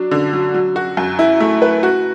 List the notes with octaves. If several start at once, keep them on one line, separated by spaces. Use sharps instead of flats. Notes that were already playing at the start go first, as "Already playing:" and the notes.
Already playing: F#3 D4
D3
F#3
F#3
F#4
F#2
E4
A3
B4
F#4